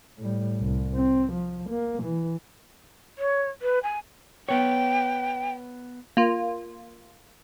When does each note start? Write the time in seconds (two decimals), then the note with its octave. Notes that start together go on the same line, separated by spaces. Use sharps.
0.19 A2 G3
0.60 C2
0.96 C4
1.33 F3
1.70 A#3
2.03 E3
3.18 C#5
3.62 B4
3.83 G#5
4.49 B3 C#5 G5
6.17 A#3 F4